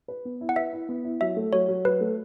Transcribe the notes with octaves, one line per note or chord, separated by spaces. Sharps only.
B4
B3
E4
F#5
B4 E5
E4
B3
E4
F#3 E5
A3
F#3 C#5
F#3
F#3 B4
A3